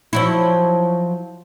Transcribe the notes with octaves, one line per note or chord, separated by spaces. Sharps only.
F3 F#3 E4